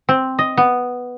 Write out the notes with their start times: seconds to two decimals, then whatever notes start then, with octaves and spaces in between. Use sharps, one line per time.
0.09 C4
0.39 D#5
0.57 B3